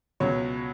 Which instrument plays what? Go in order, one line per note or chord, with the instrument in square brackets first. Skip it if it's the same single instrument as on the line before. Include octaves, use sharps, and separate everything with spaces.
[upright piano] C#2 B2 F#3 C#4 C#5